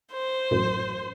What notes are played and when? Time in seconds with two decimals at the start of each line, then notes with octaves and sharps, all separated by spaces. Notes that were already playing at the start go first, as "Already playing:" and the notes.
0.12 C5
0.51 A1 F#2